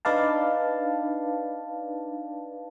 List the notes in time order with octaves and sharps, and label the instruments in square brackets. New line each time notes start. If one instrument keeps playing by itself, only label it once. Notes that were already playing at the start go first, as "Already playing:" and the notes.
[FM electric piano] D4 D#4 B4 D5 F5 A5